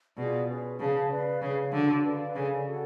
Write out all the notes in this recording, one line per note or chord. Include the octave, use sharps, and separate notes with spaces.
B2 F4 G#4 D5
C#4 G#4 B4
C#3 G#4 C#5 F5 A5
B4 D5 F5
C#3 C#4 G#4 C#5 F5
D3 D4 F#4 A4
B4 D5 F5
C#3 A4 D5 F5 G#5
F#4 A4 D5 F#5